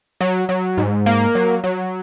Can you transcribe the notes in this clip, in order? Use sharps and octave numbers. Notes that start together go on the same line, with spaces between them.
F#3
F#3
G#2
A#3
F#3
F#3